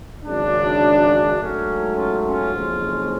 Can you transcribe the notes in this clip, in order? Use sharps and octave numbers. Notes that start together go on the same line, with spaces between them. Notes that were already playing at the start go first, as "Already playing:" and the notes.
G#1 F#2 C#3 D4
G#2 F#3 A3 C#4
C#4 F4
C#4 F4
F#1 F2 F3 G#3 C#4